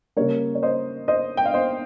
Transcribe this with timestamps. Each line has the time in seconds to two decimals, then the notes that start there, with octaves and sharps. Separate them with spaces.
0.16 C#3 G3 A#3 A#4 C#5
0.55 C#5
0.63 C5 D#5
1.08 C5 D#5
1.37 G5
1.46 F5
1.54 C5 D#5